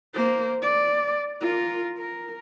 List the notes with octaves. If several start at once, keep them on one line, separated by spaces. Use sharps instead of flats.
A#3 C5
D5
F4 A#4
A#4